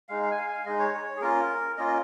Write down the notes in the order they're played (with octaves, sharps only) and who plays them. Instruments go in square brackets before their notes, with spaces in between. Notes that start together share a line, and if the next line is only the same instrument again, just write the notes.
[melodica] G#3 D#4 F5
F5
G#5
F5
G#5
F5
G#3 D#4 D#5
C#5
C#5
G#4
A#3 C#4 F4 A#4
A#3 C#4 F4 D#5
D#5